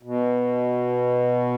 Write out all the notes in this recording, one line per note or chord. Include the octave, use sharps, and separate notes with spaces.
B2